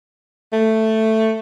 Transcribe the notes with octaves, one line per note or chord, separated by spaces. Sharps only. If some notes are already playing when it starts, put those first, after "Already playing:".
A3